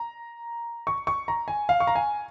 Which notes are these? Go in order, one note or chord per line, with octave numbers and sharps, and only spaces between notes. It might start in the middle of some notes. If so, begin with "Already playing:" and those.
Already playing: A#5
C#6
C#6
A#5
G#5
F5
C#6
A#5
G#5